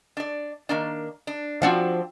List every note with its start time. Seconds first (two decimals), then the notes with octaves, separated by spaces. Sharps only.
0.17 D4 D5
0.69 D#3 A#3 D4
1.27 D4
1.62 F3 C4 D4 F#4 F5